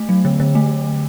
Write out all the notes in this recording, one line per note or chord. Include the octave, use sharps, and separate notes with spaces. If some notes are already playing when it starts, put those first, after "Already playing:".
Already playing: A3
F#3
D3
D3
A3